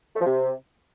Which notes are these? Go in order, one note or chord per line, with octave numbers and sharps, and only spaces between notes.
A3
F3
C3